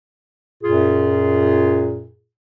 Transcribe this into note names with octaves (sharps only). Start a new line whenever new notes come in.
F#2 A#2 F4 G#4